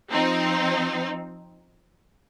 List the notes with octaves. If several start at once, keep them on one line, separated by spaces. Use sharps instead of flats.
F3 C4 D#4